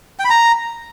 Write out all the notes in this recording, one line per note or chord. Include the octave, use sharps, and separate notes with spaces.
G5
B5
A#5